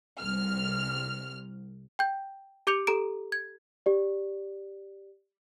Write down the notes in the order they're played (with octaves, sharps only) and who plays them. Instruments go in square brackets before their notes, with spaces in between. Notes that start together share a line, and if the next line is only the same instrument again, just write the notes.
[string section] C2 F6
[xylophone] G5 G6
G4 D6 G6 C#7 F7
G4 A4 A#5 D7
G#6
[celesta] G4 D5